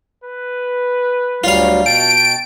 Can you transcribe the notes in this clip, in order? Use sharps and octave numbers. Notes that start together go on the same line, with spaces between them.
B4
D2 F#3 G3 F4 F5
B2 G5 A5 D7